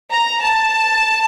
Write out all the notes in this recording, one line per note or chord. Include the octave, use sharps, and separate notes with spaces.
A#5
A5